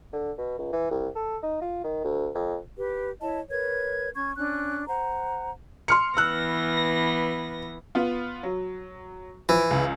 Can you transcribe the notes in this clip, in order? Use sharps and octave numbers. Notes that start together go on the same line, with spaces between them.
D3
B2
C#2
E3
C2
A4
D#4
F4
D#3
D2
F2
G4 B4
E4 C#5 D#5 A5
A#4 B4 C#5 G#6
C#4 C#6 G#6
C#4 D4 F#6
C5 F#5 A#5
C6 F6 C#7
E3 B3 E6 F#6 A#6
B3 F4
F#3
E3 F3
C#2